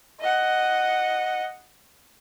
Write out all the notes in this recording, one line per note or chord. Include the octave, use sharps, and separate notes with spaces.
D#5 F#5